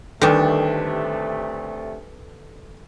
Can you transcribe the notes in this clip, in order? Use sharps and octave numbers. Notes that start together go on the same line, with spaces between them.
D2 C3 D#3 G3 A3 D4 A4 B4